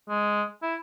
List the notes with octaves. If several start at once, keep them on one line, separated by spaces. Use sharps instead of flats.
G#3
E4